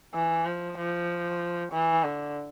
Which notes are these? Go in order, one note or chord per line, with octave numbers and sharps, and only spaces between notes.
E3
F3
F3
E3
D3